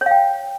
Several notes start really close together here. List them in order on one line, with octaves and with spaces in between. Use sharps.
C#5 F5 G5